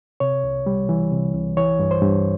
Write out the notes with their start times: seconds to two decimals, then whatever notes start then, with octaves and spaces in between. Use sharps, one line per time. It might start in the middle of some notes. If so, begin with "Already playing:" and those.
0.20 C3 C#5
0.44 C2
0.66 G3
0.89 E3
1.12 C3
1.34 C2
1.57 E3 C#5
1.79 G2
1.91 C5
2.02 G2